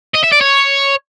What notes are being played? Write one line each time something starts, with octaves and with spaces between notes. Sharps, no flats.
D#5
E5
D5
C#5